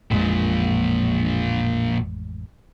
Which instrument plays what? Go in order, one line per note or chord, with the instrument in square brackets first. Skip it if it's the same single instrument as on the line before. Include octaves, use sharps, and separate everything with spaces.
[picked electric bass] A1 F2 G#3 [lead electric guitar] A#2 F3